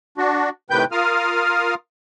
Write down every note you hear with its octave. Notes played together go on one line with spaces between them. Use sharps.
D4 F#4
A2 C3 D#3 B4 G5 G6
F4 A#4 F5 D#6 F6